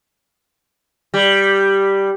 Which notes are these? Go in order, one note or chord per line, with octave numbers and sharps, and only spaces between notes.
G3